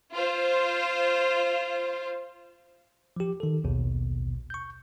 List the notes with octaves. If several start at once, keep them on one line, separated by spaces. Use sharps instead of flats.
F4 C5
F3 G4
D#3 A4
A#1 D#2 B2
C#6 G6